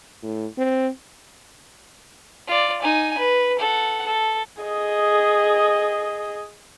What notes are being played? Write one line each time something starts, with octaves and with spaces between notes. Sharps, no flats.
A2
C4
F4 D5
D#4 G#5
B4
A4 F#5
A4
G#4 D#5